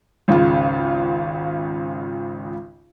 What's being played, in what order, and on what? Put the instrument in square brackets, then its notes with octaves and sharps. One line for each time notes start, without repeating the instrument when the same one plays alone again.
[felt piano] G#1 C#2 C#3 F4